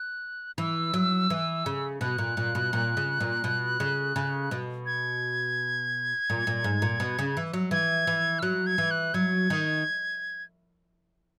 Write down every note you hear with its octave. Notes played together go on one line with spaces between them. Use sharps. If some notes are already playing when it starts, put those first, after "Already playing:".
Already playing: F#6
E3 E6
F#3
E3
C#3
B2 F#6
A#2
A#2
B2
A#2
C#3
A#2
B2
C#3
C#3
B2
G#6
A#2
A#2
G#2
A#2
B2
C#3
E3
F#3
E3 G#6
E3
E6
F#3 F#6
G#6
E3
F#6
F#3 G#6
D#3